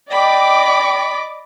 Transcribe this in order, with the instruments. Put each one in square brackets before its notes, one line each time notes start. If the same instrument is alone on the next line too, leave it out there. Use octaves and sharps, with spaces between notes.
[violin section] D5 D#5 D6 [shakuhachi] G5 [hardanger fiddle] B5